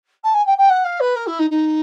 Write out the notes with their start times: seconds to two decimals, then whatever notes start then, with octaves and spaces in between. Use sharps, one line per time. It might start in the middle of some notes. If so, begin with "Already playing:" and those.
0.24 A5
0.34 G#5
0.46 G5
0.58 G5
0.69 F#5
0.84 F5
1.00 B4
1.15 A#4
1.26 E4
1.39 D#4
1.50 D#4